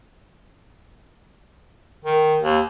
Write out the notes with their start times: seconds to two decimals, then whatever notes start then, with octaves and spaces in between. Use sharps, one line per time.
2.05 D#3
2.41 D#2